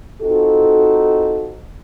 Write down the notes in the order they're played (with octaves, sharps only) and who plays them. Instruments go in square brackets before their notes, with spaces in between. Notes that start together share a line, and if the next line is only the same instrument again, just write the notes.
[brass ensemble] C4 D#4 F4 F#4 A4